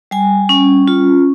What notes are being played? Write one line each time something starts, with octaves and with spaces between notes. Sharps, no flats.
G3 G#5
C#4
F4